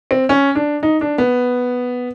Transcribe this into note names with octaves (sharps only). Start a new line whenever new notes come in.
C4
C#4
D4
D#4
D4
B3